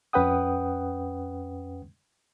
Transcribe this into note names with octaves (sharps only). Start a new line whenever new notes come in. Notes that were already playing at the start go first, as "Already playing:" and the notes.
F2 C#4 B4 F#5 G5 D#6